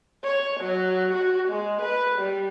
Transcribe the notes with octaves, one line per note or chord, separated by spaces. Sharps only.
C#5
F#3
F#4
G#3
B4
G3